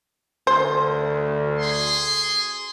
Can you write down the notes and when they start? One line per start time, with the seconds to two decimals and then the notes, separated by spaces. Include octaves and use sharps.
0.47 D2 C5
1.59 G#4 C6